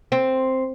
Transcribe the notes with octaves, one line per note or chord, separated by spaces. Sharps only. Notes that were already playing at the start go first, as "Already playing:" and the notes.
C4